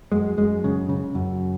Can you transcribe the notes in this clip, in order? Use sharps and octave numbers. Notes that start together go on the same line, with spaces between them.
F#2 G#3
F#2 G#3
C#3
C#3
F#2